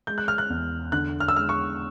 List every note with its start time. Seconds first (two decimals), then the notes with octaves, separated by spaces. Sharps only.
0.07 G#3 G6
0.18 F#6
0.28 F6
0.38 F#6
0.50 E2
0.92 D3 F#6
1.20 F6
1.28 E6
1.35 G#3 F6
1.49 C#6